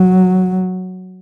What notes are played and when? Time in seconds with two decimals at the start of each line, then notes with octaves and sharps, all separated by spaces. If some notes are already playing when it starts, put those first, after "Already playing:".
Already playing: F#3